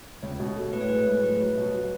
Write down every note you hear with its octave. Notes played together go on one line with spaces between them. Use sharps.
C#2 C#5
B2
A3
A2 B4
C#5
G#3 B4
A2
F#3 B4
F#3
B2
B2